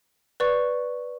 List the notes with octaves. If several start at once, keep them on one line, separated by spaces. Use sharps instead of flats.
B4 D5 C#6